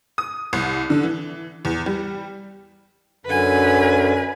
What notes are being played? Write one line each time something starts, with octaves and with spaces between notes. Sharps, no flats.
D#6
C2
D3
E3
E2
G3
F#2 D3 B4 G#5